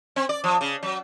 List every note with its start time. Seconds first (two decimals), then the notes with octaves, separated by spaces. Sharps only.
0.16 C4
0.29 D5
0.44 F3
0.61 C#3
0.83 F#3